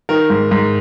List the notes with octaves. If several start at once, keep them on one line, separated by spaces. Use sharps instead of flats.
D#3 A#4
G#2
G#2